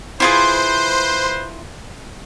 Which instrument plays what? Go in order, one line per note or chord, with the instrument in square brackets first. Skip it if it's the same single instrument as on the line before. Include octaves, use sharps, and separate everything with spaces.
[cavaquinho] E4 F4 G#4 [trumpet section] B4 C5